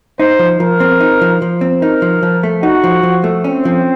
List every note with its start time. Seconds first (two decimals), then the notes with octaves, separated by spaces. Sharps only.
0.20 D#4 C5
0.39 F3
0.60 F3 A#4
0.80 C4
1.00 D#4
1.21 F3
1.42 F3
1.61 C4
1.82 D#4 A#4
2.02 F3
2.23 F3
2.43 A3
2.63 D#4 F#4
2.84 F3
3.03 F3
3.24 A3
3.44 C4 C#4
3.65 F3